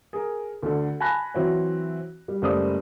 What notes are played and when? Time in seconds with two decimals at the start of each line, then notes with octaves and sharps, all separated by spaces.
0.13 G#4 A#4
0.63 D2 D3
1.00 G#5 A5 B5 C#6 F#6 A#6
1.34 E3 F#3 C4 E4 F#4 C#5
2.28 G3
2.42 F#1 G3 A3 C5 D5 D#6